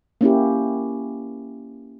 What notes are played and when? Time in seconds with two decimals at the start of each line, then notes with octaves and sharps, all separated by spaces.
0.21 A#3 C#4 E4 G4